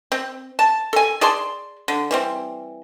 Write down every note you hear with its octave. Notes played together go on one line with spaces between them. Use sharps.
C4
A5
A4 G#5
G#4 D5 A5 C6
D3
E3 G3 C4